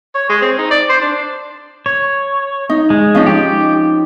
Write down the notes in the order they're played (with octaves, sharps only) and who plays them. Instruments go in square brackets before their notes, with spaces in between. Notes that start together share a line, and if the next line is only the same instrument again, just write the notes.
[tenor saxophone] C#5
G#3
C4
D#4
D5
C5
D4
[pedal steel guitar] C#5
[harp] D#4
[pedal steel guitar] G#3
[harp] F3 C#4 D#4
[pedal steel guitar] G4